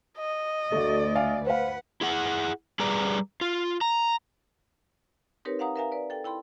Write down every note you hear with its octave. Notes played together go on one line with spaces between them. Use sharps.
D#5
D2 A3 F#4 D5
E5 F5 G#5
B4 C5 F5 F#5
E4 G#4 F#5
G3 G#4 B4 D5 A#5
F4
A#5
C4 D#4 G4 A#4 B4 C#5
F5 F#5 A#5 D#6
A#4 B4 E5 F5 G#5 A#5
B4 D5
A4 G5
E4 G5 B5 C6